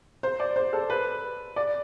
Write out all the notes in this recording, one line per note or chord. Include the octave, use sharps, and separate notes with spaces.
C5
D5
C5
A4
B4
D5